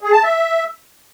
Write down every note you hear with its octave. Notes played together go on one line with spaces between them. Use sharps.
G#4
A5
E5